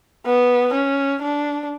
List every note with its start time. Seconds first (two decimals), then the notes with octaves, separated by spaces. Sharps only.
0.26 B3
0.73 C#4
1.22 D4